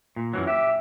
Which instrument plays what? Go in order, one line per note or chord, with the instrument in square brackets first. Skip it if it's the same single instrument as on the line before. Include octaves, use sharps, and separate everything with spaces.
[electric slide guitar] A#2
F#2 E3 F#3
[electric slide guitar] G4 [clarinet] E5